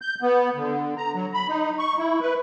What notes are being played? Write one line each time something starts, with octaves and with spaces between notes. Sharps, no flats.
G6
B3
D3
A#5
F#3
B5
D#4
C#6
E4
B4